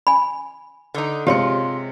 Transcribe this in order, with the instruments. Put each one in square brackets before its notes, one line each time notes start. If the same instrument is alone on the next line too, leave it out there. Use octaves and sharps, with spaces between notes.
[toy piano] G#5 B5
[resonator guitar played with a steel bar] D3 D#4
[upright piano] C3 G#3 C#7 [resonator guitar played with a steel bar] F4 [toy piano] G4 C#5 C6